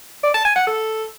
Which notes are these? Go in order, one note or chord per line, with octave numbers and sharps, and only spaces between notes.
D5
A5
G#5
F#5
A4